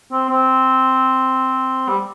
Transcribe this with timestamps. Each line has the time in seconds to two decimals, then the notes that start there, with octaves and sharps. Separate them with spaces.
0.12 C4
0.29 C4
1.88 G3